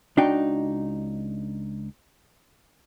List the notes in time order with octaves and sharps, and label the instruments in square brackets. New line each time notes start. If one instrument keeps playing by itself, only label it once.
[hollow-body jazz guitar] C#2 D4 D#4 F#4 G5